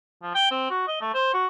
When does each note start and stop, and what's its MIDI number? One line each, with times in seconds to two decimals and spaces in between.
0.22 0.33 53
0.35 0.50 79
0.51 0.65 60
0.70 0.85 66
0.87 1.00 75
1.01 1.11 57
1.14 1.33 72
1.34 1.47 66